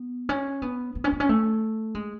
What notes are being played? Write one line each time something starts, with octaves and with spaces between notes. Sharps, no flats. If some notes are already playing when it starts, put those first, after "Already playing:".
Already playing: B3
C#4
B3
B3
C#4
B3
C#4
A3
G#3